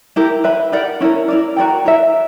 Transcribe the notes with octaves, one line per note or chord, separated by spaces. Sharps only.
E4 G4 A#4
B4 E5 B5
G4 A#4 D5 F#5
C#4 E4 A#4
E4 A#4 D5
F#4 A#4 D5 G5
E4 A#4 E5